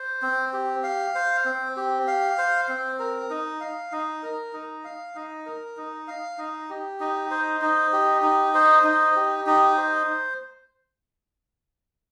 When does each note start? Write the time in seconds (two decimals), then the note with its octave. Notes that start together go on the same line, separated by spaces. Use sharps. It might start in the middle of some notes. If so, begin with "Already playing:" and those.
Already playing: C5
0.22 C4
0.53 G4
0.84 F5
1.15 C5
1.45 C4
1.77 G4
2.07 F5
2.38 C5
2.69 C4
2.99 A#4
3.30 D#4
3.61 F5
3.92 D#4
4.23 A#4
4.53 D#4
4.84 F5
5.15 D#4
5.46 A#4
5.77 D#4
6.08 F5
6.38 D#4
6.70 G4
7.00 D#4
7.31 C5
7.62 D#4
7.93 G4
8.23 D#4
8.54 C5
8.84 D#4
9.16 G4
9.47 D#4
9.78 C5